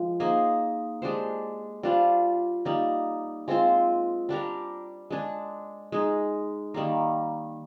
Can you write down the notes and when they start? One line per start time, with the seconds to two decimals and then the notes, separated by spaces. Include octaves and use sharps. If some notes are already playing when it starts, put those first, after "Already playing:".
Already playing: F3 G#3
0.20 A#3 D#4 G#4 C5
1.02 G#3 D4 G4 C5
1.83 G3 D4 F4 C5
2.65 G3 A#3 D#4
3.48 G#3 C4 F4 C5
4.29 G3 D4 G4 A#4
5.10 G#3 D4 G#4
5.92 G#3 D#4 G#4
6.74 D#3 G3 A#3